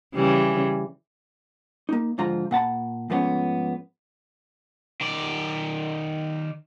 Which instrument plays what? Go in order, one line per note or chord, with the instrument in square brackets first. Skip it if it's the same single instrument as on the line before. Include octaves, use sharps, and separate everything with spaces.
[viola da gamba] C#3 E3 G3
[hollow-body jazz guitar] A#3 D#4
G#2 D3 F3 F4 A#5
A#2 F#5 A5 B5
G#2 F3 A3 B3 C#4
[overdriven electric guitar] D#3 D5